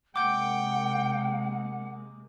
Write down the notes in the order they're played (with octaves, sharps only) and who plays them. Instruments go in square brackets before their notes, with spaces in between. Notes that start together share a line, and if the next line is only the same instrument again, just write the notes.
[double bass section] C3 G#3 A#3 [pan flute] F#5 [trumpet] G5 [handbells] D6 G6